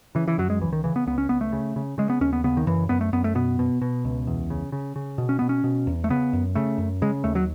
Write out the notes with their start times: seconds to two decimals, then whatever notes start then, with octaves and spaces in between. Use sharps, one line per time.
0.15 C#3 E3
0.28 E3
0.38 F#2 F#3
0.50 G#3
0.61 C#2 E3
0.73 D#3
0.84 C#3 E3
0.96 B3
1.07 C#2 B3
1.18 C#4
1.29 C#2 B3
1.41 A3
1.53 C#3
1.76 C#3
1.98 C#3 G#3
2.10 B3
2.21 D#2 C#4
2.33 B3
2.44 C#3 B3
2.57 D#3
2.67 F#2 E3
2.89 F#2 B3
3.01 A3
3.13 F#2 B3
3.24 A3
3.35 B2 B3
3.59 B2
3.82 B2
4.05 C#2
4.27 E2
4.50 C#3
4.72 C#3
4.96 C#3
5.18 B2
5.29 C#4
5.39 B2 B3
5.49 C#4
5.64 B2
5.87 E2
6.04 A3
6.10 C#3 B3
6.33 F#2
6.55 C#3 A3
6.78 F#2
7.02 C#3 G#3
7.24 D#2 A3
7.35 F#3